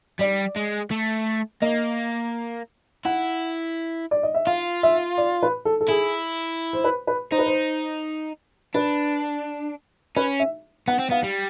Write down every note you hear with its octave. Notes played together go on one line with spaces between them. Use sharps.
G3 D5
G#3
A3
A#3 D#5
E4 F#5
D5
D#5
E5
F4 F5
E5
D5
B4
A4
A4
E4 G#4
C5
B4
B4
D#4 C5
B4
C5
D4 B4
C#4 B4
E5
B3 F#5
C4
B3 F5
G3